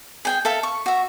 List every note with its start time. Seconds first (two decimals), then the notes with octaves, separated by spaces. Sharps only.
0.25 G#4 G5 G#5
0.45 A4 E5 F5
0.63 C#6
0.86 F#4 E5